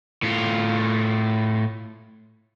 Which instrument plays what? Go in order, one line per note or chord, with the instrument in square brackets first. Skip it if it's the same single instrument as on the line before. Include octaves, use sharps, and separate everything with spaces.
[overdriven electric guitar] A2 F4